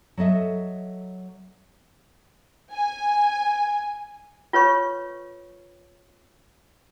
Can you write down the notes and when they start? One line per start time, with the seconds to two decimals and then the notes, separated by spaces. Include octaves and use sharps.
0.17 F#3 A4 D#5 E5
2.72 G#5
4.53 F4 B4 C#5 C#6